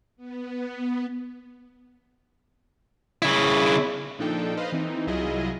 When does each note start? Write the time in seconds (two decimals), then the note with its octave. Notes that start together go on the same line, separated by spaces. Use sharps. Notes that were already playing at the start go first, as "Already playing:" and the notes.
0.17 B3
3.22 C#3 E4
4.19 A#2 F3 D4 D#4 A4 G5
4.57 B4 C5 D#5 F5
4.72 E3 C4 D#4
5.07 C2 F#3 E4 F4 G#4 D#5